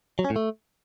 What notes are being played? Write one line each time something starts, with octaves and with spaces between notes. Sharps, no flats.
F#3
C#4
A2
A3